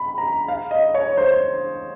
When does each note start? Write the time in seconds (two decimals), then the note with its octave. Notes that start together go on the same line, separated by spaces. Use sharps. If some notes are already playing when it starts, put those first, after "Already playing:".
Already playing: B5
0.18 A#5
0.48 F5
0.71 D#5
0.94 C#5
1.17 C5